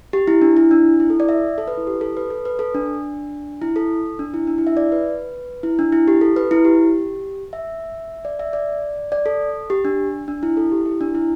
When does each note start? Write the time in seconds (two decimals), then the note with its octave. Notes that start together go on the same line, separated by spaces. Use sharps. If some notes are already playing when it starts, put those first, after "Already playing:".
0.13 G4
0.27 E4
0.42 D4
0.57 E4
0.71 D4
1.00 E4
1.10 A4
1.20 D5
1.29 E5
1.58 A4
1.68 B4
1.77 E4
1.87 G4
2.01 A4
2.17 B4
2.30 A4
2.45 B4
2.59 A4
2.74 D4
3.62 E4
3.76 A4
4.19 D4
4.34 E4
4.47 D4
4.58 E4
4.67 E5
4.77 D5
4.92 B4
5.63 E4
5.79 D4
5.92 E4
6.08 G4
6.21 A4
6.36 B4
6.51 E4
6.65 G4
7.53 E5
8.25 D5
8.40 E5
8.53 D5
9.12 D5
9.26 A4
9.70 G4
9.85 D4
10.28 D4
10.43 E4
10.57 A4
10.72 G4
10.85 E4
11.01 D4
11.15 E4